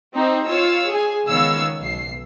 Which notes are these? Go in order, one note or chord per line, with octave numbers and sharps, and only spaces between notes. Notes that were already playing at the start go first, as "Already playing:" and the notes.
C4 D#4 G4 C5
F4 C#5 F5 E6
G#4 G#5
C#2 D#3 B3 C#5 F5 E6
B1 C7